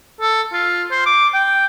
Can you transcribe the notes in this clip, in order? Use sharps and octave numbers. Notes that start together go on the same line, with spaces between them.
A4
F4
C5
D6
G5